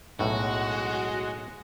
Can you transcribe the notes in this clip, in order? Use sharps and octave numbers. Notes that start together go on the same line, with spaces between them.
B1 A2 G#3 F#4